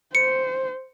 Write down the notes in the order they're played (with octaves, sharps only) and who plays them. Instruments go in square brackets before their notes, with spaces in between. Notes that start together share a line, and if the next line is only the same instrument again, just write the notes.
[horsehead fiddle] C5 [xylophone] C#7